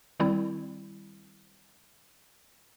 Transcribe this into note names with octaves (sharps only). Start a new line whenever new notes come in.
D#3 G3 C4 E4